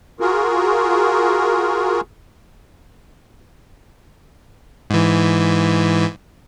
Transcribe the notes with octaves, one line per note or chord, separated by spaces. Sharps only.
F4 F#4 G#4 A#4
G#2 E3